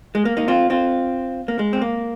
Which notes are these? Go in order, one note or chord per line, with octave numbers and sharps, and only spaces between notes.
G#3
A#3
A#3 D#4
C4 F4
C4 F4
A#3
G#3
C4
A#3